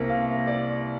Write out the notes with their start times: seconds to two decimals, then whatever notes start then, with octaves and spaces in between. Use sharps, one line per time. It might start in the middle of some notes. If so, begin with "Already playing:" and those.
Already playing: C2 C3 A#3
0.09 F5
0.47 D5